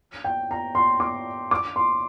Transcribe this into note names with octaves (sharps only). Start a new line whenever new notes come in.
G5
A#5
C6
D6
D6
C6